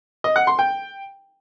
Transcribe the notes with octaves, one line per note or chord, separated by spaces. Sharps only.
D#5
F#5
C6
G5